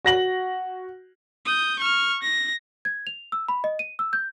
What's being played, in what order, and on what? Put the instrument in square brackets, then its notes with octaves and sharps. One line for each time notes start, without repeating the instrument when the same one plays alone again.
[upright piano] F#4 A#6 F#7
[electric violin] D#6 G6
C#6 F6
A#6
[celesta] G#6
F7
E6
B5
D#5
D#7
E6
G6